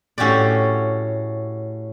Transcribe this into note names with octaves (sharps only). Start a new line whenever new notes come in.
A2 C#4 F#4 G4 D5